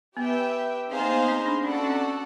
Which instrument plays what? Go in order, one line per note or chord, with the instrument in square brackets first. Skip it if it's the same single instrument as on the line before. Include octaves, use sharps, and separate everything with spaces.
[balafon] B3 [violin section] G4 B4 E5 G5
[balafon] C4 [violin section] D#4 G#4 C5 F5
[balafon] A#3
B3
C4
D4
[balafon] C#4 [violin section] F#4 A4 D5 F#5
[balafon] C#4
C4